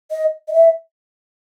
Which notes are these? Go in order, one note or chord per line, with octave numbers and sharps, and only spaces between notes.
D#5
D#5
E5